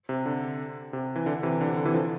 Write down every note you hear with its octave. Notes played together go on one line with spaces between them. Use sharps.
C3
D3
C3
E3
D3
C3 E3
D3
C3
D3
C3 E3
D3 F3